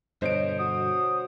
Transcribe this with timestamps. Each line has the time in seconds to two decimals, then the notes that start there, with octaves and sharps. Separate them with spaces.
0.22 G2 B2 D3 C5 C#5 D#5 D7
0.59 F#4 D#6